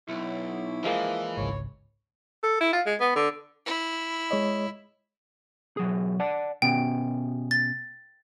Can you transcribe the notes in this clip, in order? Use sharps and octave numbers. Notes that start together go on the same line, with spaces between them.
B1 E4
E3 F3 G#3 A#3
G#1 C#2 C#5
A4
E4
F4
G#3
B3
D3
E4
G#3 C#5 D#5
B1 F#3 G#4
D5 F#5 A5
B2 B3 C#4 G5
A6